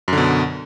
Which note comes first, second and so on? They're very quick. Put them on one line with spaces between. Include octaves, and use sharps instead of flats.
F#2 D3 B2